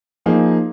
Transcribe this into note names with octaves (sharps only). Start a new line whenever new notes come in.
F3 A#3 D#4 G#4